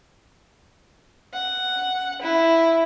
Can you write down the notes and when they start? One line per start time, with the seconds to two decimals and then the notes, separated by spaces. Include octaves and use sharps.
1.34 F#5
2.22 E4